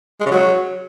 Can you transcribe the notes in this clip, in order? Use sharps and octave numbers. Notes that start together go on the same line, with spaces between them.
G#3
C#3
F#3